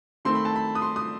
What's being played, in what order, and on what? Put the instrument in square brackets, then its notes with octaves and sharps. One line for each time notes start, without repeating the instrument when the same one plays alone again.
[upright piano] D#3 A3 C4 C6
B5
A5
B5
D#6
C6
D#6